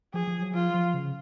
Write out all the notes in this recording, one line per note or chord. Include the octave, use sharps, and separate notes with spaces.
F3 G#4
F3
F#3
F3 F4
F3
C#3